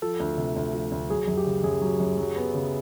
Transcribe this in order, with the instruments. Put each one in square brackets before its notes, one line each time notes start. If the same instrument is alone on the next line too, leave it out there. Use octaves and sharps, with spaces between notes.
[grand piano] F3 [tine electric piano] A4
[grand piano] D2
C3
D2
F3
D2
[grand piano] F#3 [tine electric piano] G#4
[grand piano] F#2
[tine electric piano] G4
[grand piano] C#3
[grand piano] F#2 [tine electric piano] G#4
[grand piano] F#3
F#2
F#3
B3
C#3